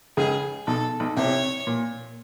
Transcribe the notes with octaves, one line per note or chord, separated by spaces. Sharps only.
C#2 C#3 G#4
B1 B2 A4
B1 B2
C2 C3 C#5
A#2